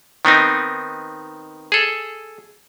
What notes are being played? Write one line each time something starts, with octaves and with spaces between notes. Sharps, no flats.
D#3 B3 C4 D#4
G#4 A4